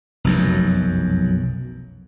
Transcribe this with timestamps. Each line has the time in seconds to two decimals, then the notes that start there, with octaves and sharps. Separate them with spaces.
0.24 F1 B1 F#2